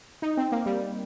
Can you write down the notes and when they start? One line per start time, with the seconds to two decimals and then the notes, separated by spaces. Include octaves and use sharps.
0.22 D#4
0.37 C4
0.52 A#3
0.66 G3